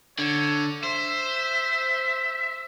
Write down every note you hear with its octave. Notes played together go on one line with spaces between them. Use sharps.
D3 C#5
C5 E5